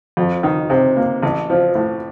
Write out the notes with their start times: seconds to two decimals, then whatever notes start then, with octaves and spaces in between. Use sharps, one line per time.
0.17 F2
0.43 D#3
0.70 C3
0.96 A#3
1.23 A1
1.50 F3
1.75 A2